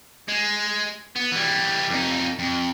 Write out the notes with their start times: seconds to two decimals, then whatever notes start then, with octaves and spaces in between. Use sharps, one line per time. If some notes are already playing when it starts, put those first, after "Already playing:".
0.28 G#3
1.16 B3
1.32 E3 G3
1.90 F2 D#4
2.39 F2